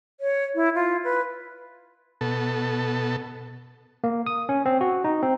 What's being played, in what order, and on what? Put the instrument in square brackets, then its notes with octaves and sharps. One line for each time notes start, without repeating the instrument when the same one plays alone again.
[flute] C#5
E4
F4
B4
[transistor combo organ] B2 A4
[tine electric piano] A#3
D#6
C#4
C4
F#4
D#4
C4